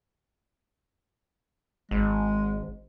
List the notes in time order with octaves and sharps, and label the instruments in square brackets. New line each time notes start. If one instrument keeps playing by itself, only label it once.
[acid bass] G#1 [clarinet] G#3